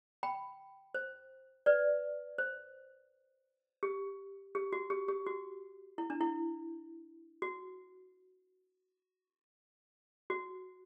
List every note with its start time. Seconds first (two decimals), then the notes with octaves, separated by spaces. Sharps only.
0.23 G5 B5
0.95 C5
1.66 B4 D5
2.38 C5
3.83 G4
4.55 G4
4.73 F#4
4.90 G4
5.08 G4
5.26 F#4
5.98 E4
6.10 D4
6.21 E4
7.42 F#4
10.30 F#4